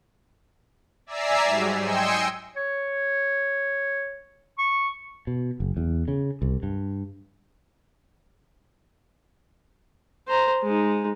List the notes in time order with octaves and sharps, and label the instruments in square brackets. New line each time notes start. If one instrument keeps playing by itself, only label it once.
[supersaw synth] D5 E5 G#5 A#5 E6 C7
G#2 F#3 G3
D#5 G5 G#5 C6 E6 C#7
[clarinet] C#5
C#6
[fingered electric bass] B2
F#1
E2
C#3
C2
G2
[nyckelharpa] C5 A#5
G#3 D#4